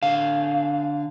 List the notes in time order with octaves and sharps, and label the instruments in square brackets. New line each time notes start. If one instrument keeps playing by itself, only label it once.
[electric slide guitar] D3 F5